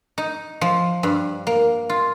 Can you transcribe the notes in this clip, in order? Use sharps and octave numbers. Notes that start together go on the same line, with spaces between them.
D#4
F3
G2
A#3
F4